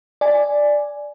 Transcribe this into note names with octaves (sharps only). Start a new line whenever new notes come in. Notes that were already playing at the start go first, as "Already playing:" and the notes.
D5 G#5